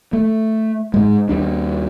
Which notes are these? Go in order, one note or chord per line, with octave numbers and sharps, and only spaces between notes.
A3
G#2 G#3
D#2 G3 D4